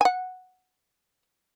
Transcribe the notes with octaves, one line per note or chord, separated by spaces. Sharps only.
F#5 G#5